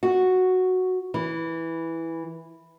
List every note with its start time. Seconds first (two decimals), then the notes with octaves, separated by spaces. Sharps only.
0.03 F#4
1.14 E3